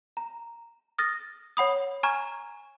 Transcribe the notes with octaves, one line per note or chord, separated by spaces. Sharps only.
A#5
D#6 F6 A6 A#6
C#5 F#5 B5 D#6
G#5 A#5 C#6 F6 G#6 E7